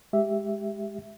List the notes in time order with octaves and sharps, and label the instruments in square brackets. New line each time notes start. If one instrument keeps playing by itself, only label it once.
[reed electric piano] G#3 G4 E5